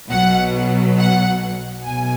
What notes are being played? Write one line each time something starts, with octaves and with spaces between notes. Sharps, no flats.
B1 B2 F#3 F#5
F#5
B1 B2 G#5